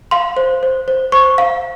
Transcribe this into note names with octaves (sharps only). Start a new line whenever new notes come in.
F5 C6
C5
C5
C5
C5 C#6
F5